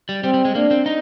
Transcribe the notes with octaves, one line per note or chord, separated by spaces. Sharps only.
G3
G3 C4
G3
G#3
A#3 D4
C4
D#4